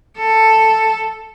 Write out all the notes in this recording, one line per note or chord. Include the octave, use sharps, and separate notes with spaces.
A4